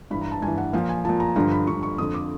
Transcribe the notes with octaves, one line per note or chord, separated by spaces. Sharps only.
G2 E3 B5
A#5
A5
G2 E3 G#5
F#5
A#2 F3 F5
G#5
A#2 F3 A5
A#5
G2 D3 F3 A#5
B5
G2 D3 F3 C#6
C#6
F2 D3 F3 D#6
D6